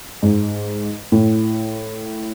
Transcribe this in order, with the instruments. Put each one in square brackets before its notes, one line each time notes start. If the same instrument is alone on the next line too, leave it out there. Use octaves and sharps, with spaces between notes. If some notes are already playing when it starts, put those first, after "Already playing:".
[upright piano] G#2
A2